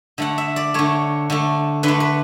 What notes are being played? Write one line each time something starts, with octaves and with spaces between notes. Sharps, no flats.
D3 A3 F#5
E5
D5
D3 A3 C#5
D3 A3
D3 A3 B4
B4